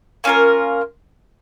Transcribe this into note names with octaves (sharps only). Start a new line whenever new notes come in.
A#3 C#4 F4 A#4